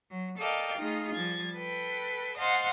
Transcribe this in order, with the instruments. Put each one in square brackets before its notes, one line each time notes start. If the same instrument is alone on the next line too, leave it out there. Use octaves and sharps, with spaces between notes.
[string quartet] F#3
A4 A#4 D5 D#5 F5 G5
A3 D#4 F4 G#4
F3 G3 G#6 A6
A4 B4 G5
C5 D#5 F5 F#5 A5 C6